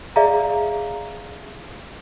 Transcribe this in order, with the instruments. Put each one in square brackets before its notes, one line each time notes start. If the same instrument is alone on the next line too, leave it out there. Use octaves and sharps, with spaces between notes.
[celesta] G#4 D5 E5 F5 A#5